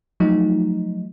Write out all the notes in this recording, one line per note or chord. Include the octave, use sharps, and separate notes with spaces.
F3 F#3 A3 D#4